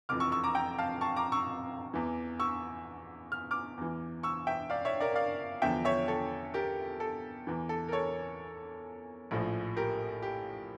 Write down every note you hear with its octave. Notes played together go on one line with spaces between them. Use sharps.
F1 F2 E3 D6 F6
C#6 E6
C#6 E6
A#5 D6
G5 A#5
F5 A5
A5 C#6
A#5 D6
C#6 E6
E2 E3
C#6 E6
F6
D6 F6
E2 E3
C#6 E6
E5 G5
D5 F5
C#5 E5
A#4 D5
D5 F5
E2 D3 F3 E5 G5
C#5 E5
A4 C#5
G4 A#4
A4
E2 E3
A4
A#4
A4 C#5
A#1 A2 F3
G4 A#4
G4